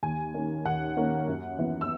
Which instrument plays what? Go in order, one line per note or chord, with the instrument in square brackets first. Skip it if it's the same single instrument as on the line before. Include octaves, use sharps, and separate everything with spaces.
[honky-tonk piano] D#2 G#5
D#3 A#3 C#4
D#2 F#5
D#3 A#3 C#4
F#2
E3 B3
E6